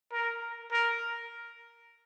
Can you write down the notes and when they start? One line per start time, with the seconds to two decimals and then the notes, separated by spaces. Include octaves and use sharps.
0.12 A#4
0.71 A#4